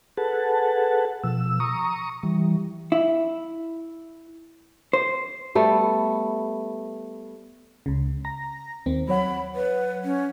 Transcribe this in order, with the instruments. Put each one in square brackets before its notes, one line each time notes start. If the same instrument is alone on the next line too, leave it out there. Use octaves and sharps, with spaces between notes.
[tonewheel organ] G#4 A4 B4 F#5 A5
B2 F3 E6
A#5 C#6 D#6
E3 G3
[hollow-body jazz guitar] E4
C5
[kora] G3 A3 B3
[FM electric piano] C#2 C#3
A#5 A#6
D#2 D#3 C4
[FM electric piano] F#3 C#5 F#5 [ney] B5
[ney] B4
C#4